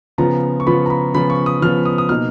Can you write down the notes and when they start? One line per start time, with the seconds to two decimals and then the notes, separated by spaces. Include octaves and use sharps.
0.18 C#3 F3 B3 F4 A#5
0.60 C#6
0.67 C#3 F3 B3 F4 B5
0.86 A#5
0.90 B5
1.14 C#3 F3 B3 F4 B5
1.30 C#6
1.46 D#6
1.62 C#3 F3 B3 F4 F6
1.85 D#6
1.98 D#6
2.09 B2 A#3 D#4 F6